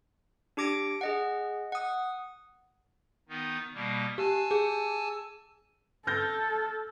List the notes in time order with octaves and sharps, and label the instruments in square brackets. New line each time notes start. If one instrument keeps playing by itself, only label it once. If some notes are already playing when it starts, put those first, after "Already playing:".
[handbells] D4 G4 D6 A#6 D7
G#4 D#5 F#5
F#5 D#6
[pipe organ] D#3 B3 D#4
B2 G3 A#3
[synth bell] G4 [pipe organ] G#5 A5 E6
[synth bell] G#4
[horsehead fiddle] A4 [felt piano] F6 G6 A#6